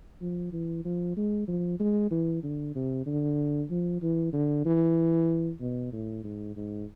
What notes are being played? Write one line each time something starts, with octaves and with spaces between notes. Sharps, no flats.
F3
E3
F3
G#3
F3
G#3
E3
D3
C3
D3
F3
E3
D3
E3
B2
A2
G#2
G#2